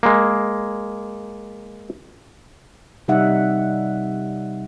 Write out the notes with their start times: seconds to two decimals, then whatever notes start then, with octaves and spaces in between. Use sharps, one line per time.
0.03 G#3 A#3
3.08 C3 G3 D#4 E5 F#5